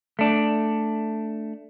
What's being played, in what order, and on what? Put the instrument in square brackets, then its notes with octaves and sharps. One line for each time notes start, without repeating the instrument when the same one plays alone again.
[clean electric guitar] A3 D4